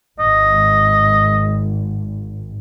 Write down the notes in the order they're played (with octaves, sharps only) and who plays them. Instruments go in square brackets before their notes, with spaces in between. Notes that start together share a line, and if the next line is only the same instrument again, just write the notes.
[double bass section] G#1 [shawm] D#5